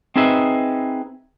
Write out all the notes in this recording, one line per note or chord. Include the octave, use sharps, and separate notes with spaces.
C4 D#4 G#4 B4 E5